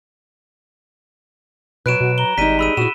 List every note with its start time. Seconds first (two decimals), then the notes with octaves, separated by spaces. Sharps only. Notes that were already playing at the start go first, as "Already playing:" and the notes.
1.86 B2 F#3 B4 F#6 D7 E7
2.01 B2 F#4
2.18 A#5 G7
2.38 G#1 G3 G#3 D#4 B6 D#7
2.59 G#4 B5 E6 D#7
2.77 A#2 E4 F#4 E7